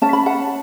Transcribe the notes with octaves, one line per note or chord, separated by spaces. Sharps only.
C#4 A5
B5
F#5 A5